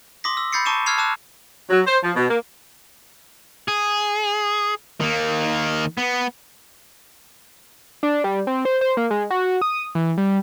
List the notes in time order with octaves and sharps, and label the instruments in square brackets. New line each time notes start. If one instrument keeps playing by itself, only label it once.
[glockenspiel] C6 D6 D#6 A#6 B6
E6
B5 G6 A6 C7 C#7
A5 A#5 C#6 D6 D#7 E7
C#6 E6 F6 G#6 C7 F7
A5 D6 E6 F#6 E7
[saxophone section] F#3
C5
F3
B2
A#3
[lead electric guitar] G#4
D#3 A#3
B3
[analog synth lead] D4
G3
C4
C5
C5
A#3
G#3
F#4
D#6
E3
G3